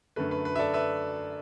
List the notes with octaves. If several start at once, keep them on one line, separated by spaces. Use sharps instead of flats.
F#2 D3 A3 B4
B4
B4
E5
A4 D5
B4 E5